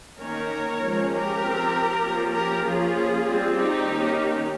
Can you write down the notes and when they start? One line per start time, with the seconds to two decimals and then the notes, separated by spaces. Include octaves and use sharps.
0.20 D#3 A#3 C#4 A#4 C#5
0.82 F3 G#3 C#4
1.12 G4 A#4
1.43 F3 C4
2.04 F3 A#3 C#4
2.34 G4 A#4
2.65 F3 A#3 C#4 F4 G#4
3.26 G3 C4
3.56 D#4 G4
3.87 D#3 A#3 C#4